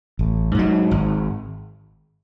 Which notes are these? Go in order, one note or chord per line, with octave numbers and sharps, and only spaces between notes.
A1
G#2 F#3
G#1